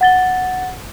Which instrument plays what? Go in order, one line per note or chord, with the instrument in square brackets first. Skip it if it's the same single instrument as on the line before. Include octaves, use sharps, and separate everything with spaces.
[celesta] F#5 A6 G7